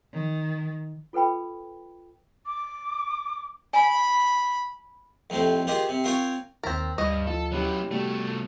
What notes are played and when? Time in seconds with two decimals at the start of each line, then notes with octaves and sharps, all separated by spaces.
0.13 D#3
1.13 F4 A4 B4 G5 B5
2.45 D6
3.73 G#5 B5
5.30 F2 A2 C3 C5
5.67 D#3 F4 G4 G#4 A#4 C5
5.89 C3
6.04 C4 F4 A#4 C#5 G5 G#5
6.63 D#2 D#3 C4 A#4 A6 B6
6.98 D2 G2 D#5
7.27 F3 A4
7.52 F#3 B3 C#4 E4 G4
7.91 C2 G3 A3 B3 F#4